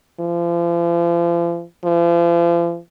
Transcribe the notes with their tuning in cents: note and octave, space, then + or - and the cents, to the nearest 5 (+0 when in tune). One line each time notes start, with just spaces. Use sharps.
F3 -40
F3 -40